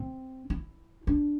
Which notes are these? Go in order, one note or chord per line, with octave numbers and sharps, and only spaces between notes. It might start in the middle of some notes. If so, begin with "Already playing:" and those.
Already playing: C4
E4
D4